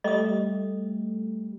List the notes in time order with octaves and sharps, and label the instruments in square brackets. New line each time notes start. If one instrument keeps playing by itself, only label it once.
[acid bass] G3 [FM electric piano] A3 [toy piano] D#5 D#6